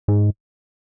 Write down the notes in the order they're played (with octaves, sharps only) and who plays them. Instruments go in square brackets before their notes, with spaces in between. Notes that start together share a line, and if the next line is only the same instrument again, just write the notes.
[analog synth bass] G#2